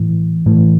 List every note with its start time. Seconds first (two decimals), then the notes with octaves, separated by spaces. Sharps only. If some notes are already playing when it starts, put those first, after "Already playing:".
Already playing: A2 E3
0.46 A2 E3